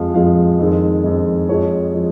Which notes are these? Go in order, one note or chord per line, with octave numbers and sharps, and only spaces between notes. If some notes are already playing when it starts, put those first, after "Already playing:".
Already playing: F2 F3 G#3 F5
F2 F3 G#3 F5
F2 D#3 G#3
F2 D#3 G#3 D#5
F2 F3 G#3 C#5
F3 G#3